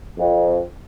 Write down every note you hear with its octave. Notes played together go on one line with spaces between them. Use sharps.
F2